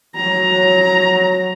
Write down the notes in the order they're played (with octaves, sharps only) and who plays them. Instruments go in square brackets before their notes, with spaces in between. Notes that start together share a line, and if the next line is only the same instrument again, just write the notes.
[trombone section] F#3 [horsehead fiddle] A#5